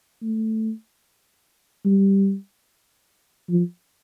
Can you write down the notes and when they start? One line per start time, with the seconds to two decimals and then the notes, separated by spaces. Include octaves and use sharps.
0.22 A3
1.85 G3
3.49 F3